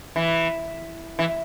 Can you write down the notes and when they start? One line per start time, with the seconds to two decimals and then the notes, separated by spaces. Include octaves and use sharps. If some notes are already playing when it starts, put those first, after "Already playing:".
0.16 E3
1.19 E3